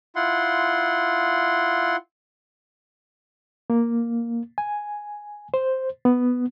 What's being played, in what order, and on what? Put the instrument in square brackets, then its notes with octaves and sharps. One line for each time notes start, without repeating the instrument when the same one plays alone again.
[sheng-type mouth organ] E4 F4 F#5 C6
[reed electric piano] A#3
G#5
C5
B3